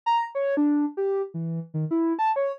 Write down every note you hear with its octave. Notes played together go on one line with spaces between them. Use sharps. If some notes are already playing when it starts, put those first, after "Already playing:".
A#5
C#5
D4
G4
E3
D#3
E4
A5
C#5